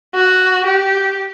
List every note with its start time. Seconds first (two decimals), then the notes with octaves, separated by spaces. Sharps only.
0.15 F#4
0.66 G4